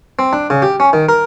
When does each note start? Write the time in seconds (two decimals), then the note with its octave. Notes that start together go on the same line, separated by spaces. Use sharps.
0.19 C4
0.33 D4
0.50 C#3
0.62 G4
0.80 C#4
0.93 D#3
1.09 A#4